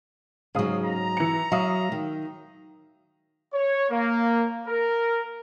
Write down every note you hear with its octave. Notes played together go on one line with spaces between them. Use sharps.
G#2 C#3 F#3 F5 D#6
A#5
E3 C#7
F#3 E5 F5 D#6
D#3
C#5
A#3
A#4